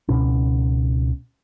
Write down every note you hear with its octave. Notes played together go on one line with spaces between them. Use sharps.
C#2 B2 C#4